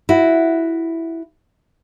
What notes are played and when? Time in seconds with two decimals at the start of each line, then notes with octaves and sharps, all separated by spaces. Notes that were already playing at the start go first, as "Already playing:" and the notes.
0.09 E4 F#4